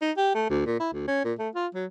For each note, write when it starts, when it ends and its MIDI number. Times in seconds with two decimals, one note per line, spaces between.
0.01 0.11 63
0.17 0.33 67
0.34 0.48 57
0.50 0.62 38
0.66 0.77 46
0.80 0.91 64
0.93 1.03 38
1.07 1.21 61
1.25 1.33 46
1.39 1.49 57
1.55 1.67 65
1.74 1.85 54